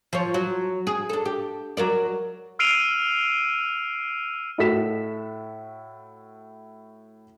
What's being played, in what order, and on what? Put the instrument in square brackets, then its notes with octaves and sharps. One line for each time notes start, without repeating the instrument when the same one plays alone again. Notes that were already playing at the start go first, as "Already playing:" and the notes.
[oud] F3 C#5
F#3
G#4
D4 A4
G4
F#3 A#4 D5
[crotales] E6 F6 C7 D7 D#7 F7
[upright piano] A2 F#4 A4 B6 E7